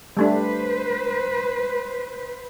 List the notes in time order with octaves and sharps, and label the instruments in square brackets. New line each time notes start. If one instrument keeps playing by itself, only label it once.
[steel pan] G3 A3 D4 [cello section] B4 C5